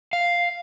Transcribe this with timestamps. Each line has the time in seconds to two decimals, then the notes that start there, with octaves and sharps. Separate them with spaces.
0.13 F5